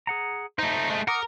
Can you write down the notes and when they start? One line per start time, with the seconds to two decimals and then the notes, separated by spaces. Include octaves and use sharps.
0.07 G#4 F#5 A#5
0.59 A3 D#4 C5 D#5
0.90 G#3 A3
1.08 A#4 F#5 D6 D#6